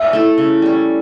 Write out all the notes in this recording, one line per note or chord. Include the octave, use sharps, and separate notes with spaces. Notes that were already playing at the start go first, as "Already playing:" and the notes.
Already playing: E5
A3 E4 A4
C#3
G3 C#4